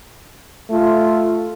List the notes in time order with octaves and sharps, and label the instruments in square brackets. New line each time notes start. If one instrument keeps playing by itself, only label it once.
[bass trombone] A3 [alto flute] F4